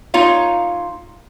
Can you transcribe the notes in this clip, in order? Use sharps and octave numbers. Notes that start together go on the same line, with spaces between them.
A#3 D#4 F4 C#5 F5